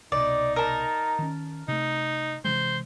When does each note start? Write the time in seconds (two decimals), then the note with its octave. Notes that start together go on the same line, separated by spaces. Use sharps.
0.12 C2 B2 D#4 D5
0.56 A#4 A5
1.19 D#3 C#4
1.68 C3 A3 D#4
2.45 C3 E3 G#3 C5